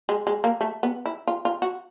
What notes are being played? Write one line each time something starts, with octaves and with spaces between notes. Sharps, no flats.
G#3
G#3
A#3
A3
B3
E4
F4
F4
F#4